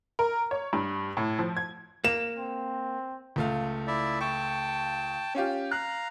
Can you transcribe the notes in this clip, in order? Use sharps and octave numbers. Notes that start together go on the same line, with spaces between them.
A#4
C#5
G2
A2
F3
G#6
A#3 E7
C4
C#2 A3 F5
E4 D5 E5
G5 A5 C#6
C#4 F4 G4
F5 A#5 F#6